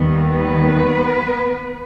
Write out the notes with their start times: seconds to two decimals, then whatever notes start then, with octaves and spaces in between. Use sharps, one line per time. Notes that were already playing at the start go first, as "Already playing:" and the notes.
Already playing: D#2 D#3 G3 B3
0.31 B3 B4